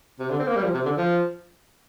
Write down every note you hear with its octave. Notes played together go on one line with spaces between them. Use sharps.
C3
D3
C4
A#3
G3
F3
C3
D3
F3